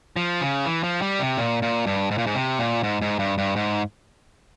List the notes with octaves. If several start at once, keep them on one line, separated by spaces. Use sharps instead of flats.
F3
C#3
E3
F3
G3
C3
A#2
A#2
G2
G#2
A#2
G#2
C3
A#2
G#2
G#2
G2
G2
G#2